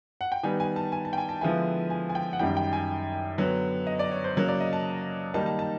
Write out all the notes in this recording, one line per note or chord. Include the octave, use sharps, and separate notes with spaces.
F#5
G5
D#3 G3 B3 G#5
G#5
A5
G#5
A5
G5
G#5
A5
D3 F3 G#3 B3 E4 G#5
G#5
G#5
G5
F#5
F#2 D#3 G3 G5
G5
G#5
D3 F#3 B3
D#5
D5
C#5
C5
C#3 F#3 A#3
D5
D#5
A5
D#3 G3 A#3 D#4 A5
A5
A5